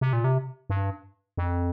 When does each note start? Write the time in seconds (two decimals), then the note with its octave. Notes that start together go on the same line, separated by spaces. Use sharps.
0.01 C3
0.13 A#2
0.24 C3
0.70 G2
1.37 F2